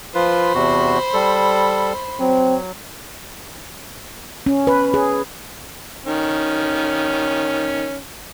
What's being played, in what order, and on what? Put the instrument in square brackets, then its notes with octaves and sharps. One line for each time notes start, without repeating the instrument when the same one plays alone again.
[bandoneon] F3 F4 B4 [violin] C5 B5
[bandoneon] E2 C3 F#4
G3 A4
[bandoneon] F#3 [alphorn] C4
[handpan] C#4
B4
G#4
[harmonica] D#3 C#4